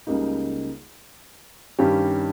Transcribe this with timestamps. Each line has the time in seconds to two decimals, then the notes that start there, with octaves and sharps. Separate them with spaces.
0.07 C#2 C#3 G3 A#3 D#4
1.79 G2 D#3 G3 C#4 G4